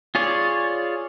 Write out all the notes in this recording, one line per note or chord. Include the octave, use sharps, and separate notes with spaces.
F4 G#4 C#5 D5